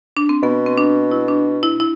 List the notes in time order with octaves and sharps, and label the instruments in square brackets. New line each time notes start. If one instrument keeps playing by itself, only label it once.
[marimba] D4
C4
[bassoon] B2 [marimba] B3
[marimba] C4
D4
E4
D4
E4
E4